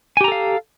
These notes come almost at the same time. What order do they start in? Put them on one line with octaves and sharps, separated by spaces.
G#5 G4 A#5 A4 F5